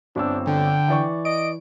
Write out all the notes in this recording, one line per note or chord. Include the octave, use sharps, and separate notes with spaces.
G1 C4 D4 E6
D3 G5
E3 D5 C#6
D#5 D7